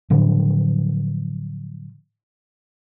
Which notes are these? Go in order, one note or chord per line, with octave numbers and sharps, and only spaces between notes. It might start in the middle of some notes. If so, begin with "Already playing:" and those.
A2 D3 F3 F#3